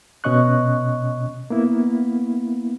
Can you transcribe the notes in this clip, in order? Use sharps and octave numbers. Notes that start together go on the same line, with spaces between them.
B2 C#4 D#5 C#6 F#6
A#3 B3 E4